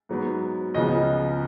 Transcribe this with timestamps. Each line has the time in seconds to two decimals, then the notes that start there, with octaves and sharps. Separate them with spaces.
0.09 G#2 F#3 B3
0.74 C#2 C#3 F3 B3 D#5